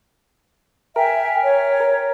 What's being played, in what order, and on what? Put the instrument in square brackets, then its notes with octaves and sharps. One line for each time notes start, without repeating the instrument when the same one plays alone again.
[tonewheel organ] A#4 [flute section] E5 G5 G#5
[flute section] C#5